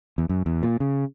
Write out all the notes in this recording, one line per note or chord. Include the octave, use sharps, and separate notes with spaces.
E2
F#2
E2
A#2
C#3